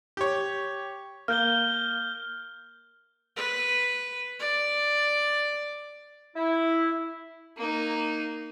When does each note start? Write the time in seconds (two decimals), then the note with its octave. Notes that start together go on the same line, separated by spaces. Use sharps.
0.17 G4 C#5
1.28 A#3 F6 G6 G7
3.37 B4
4.39 D5
6.36 E4
7.57 A#3 D#4